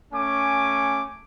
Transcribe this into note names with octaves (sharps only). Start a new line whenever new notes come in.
A3 C#4 G#5 D6